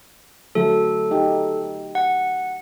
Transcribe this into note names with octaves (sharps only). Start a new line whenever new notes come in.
D3 F#3 A3 A4
D#4 G4
F#5